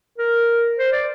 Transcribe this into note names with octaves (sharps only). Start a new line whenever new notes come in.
A#4
C5
D5